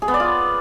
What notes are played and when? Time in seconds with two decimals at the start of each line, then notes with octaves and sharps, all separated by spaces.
0.02 G#4
0.08 B3
0.14 D5
0.20 F4